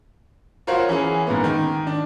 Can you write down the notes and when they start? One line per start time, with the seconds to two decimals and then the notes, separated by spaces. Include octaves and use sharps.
0.67 F4 F#4 A#4 C5 C#5 F#5
0.89 E3 C#4 G#4
1.27 G#2 A#3 B3
1.44 D#3
1.87 D4